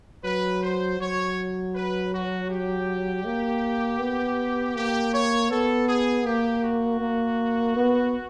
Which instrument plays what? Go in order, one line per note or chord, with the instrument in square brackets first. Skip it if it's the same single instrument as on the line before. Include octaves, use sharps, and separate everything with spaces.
[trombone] F#3 [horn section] B4
[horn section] C5
[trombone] F#3 [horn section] C#5
[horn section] B4
F#4
G4
[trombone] A#3
B3
[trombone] A#3 [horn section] G4
[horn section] C#5
[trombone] B3 [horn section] A4
[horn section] G#4
[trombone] A#3 [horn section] G4
[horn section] F#4
[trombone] A#3
B3